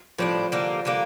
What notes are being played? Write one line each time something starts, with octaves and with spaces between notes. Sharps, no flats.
A2 F3 G3 D4
D3 G3 A#3
D3 G3 A#3